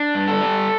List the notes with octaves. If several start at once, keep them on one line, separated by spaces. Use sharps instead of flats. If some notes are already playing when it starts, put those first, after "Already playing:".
Already playing: D4
G2
A4
G3